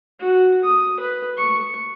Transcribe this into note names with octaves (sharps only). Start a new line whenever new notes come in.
F#4
D#6
B4
C#6